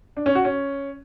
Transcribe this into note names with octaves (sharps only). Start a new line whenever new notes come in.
D4
C#4
F#4
C#4